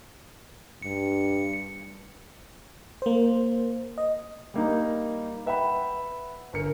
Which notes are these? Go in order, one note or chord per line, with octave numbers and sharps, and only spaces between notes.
G2 C#7
A#3 C5
D#5
G3 A#3 D#4
B4 E5 F#5 G5 B5
G1 A#4 C#7